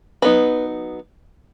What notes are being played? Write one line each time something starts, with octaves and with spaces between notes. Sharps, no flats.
F#3 B3 D#4 B4